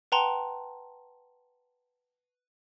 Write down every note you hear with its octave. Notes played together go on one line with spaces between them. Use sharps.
B4 F#5 G5 A5 A#5 C6